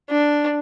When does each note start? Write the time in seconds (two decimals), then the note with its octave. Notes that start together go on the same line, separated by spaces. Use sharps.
0.10 D4